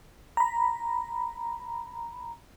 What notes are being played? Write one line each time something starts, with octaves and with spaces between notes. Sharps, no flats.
A#5 B5